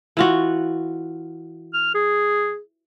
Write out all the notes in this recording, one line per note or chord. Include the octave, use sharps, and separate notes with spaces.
E3 F4 F#4
F6
G#4